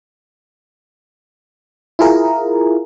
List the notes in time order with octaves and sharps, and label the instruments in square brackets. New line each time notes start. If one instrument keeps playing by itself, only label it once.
[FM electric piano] E4 F4 G#4 A#4